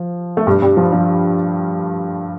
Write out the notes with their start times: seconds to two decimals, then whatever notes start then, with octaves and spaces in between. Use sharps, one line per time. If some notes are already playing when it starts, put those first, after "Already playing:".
Already playing: F3
0.37 A3
0.47 G2 G3
0.62 G2 G3
0.77 F3
0.92 F3